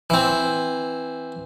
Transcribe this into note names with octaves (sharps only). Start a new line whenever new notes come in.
E3 C4